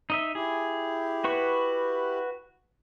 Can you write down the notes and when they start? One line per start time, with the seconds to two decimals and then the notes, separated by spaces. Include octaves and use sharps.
0.10 D#4 D#5 E5
0.35 E4 G4 G#4
1.24 F#4 B4 C#6